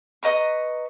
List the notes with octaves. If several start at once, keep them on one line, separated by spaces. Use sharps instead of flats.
B4 D#5 A#5 C#6